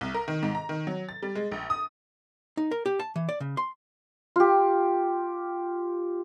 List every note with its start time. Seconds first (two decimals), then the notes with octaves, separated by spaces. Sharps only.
0.01 C2
0.14 A#4
0.28 D#3
0.43 G#2
0.55 A#5
0.69 D#3
0.87 F#3
1.09 A6
1.22 G3
1.35 G#3
1.52 A#1
1.70 D#6
2.57 D#4
2.71 A#4
2.86 G4
2.99 A5
3.16 E3
3.29 D5
3.40 C#3
3.57 C6
4.36 F4 G4